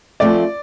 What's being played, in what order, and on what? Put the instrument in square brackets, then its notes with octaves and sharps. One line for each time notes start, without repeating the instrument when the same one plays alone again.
[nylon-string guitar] F3 A3 C4 [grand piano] D5